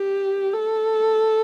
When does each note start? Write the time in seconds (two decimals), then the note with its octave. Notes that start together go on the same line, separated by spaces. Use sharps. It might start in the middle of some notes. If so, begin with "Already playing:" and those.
Already playing: G4
0.54 A4